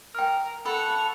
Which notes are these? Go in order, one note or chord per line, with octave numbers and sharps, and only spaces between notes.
A#4 G5 F6
A4 F#5 B5 C#6 F7